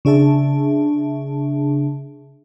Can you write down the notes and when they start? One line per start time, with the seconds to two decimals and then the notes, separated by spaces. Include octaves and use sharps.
0.05 C#3 D4 G#4 E5 A5